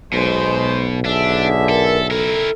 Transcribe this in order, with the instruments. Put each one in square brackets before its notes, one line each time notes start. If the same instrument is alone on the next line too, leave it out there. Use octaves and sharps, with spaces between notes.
[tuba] B1 [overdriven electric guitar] B2 [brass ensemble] G#3 C5
[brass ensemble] D3 G#4 E5 [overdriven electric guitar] D4
[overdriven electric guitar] A4 [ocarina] A#4
[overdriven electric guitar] E4 A#4 [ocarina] A4